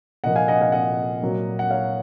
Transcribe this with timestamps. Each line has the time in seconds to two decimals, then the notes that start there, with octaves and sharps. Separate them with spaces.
0.24 A#2 F3 A#3 D#5 F#5
0.36 F5 G#5
0.48 D#5 F#5
0.61 F5 G#5
0.72 D#5 F#5
1.22 A#2 F#3 A#3
1.59 F#5
1.70 C#5 F5